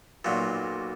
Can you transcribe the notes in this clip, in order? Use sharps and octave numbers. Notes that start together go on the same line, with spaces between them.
B1 A#2 F#3